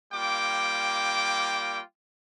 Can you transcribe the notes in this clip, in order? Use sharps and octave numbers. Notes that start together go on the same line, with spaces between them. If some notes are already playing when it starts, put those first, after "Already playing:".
G3 A#3 F4 G5 D6